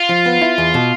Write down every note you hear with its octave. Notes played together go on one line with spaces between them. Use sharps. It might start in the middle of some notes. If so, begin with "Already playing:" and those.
Already playing: F4
F3
B3
E4
E2
B2